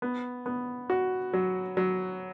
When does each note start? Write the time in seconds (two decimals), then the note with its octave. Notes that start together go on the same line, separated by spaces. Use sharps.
0.02 B3
0.46 B3
0.90 F#4
1.33 F#3
1.77 F#3